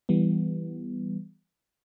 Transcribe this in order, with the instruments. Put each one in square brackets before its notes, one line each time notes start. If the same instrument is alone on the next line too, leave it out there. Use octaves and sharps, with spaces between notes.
[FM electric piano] E3 G3 B3